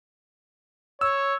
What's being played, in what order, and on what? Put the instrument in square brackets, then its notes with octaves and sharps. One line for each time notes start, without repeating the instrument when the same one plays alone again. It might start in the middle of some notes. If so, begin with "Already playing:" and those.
[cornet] C#5 [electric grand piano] E6